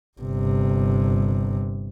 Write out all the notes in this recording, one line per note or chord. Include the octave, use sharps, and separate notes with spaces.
G1 C3